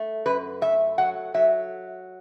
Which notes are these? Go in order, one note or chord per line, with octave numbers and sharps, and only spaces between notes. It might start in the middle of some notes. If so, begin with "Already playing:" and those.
Already playing: A3
F#2 B4
A3 E5
F#3 F#5
F#3 E5